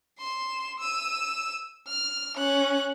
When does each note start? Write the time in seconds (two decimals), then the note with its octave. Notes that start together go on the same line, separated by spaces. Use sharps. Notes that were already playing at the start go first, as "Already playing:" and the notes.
0.19 C6 E7
0.80 E6 D#7
1.87 F6
2.37 C#4 F#6